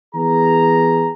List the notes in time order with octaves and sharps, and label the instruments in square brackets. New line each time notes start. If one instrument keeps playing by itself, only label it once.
[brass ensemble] E3 B3 G#4 A#5